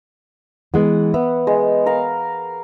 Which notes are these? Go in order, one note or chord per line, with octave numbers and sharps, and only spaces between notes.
E3 G#3 B3 F#5
B3 E5
G#3
A#4 F5